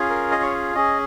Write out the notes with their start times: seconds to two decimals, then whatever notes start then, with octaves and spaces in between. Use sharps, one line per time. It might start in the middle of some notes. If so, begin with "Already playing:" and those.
Already playing: C#4 F4 G#4
0.10 A#4
0.31 D#5
0.42 C#5
0.75 C#4 G#4 D#5